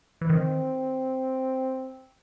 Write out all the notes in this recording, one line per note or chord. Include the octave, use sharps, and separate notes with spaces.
E3
D#3 C4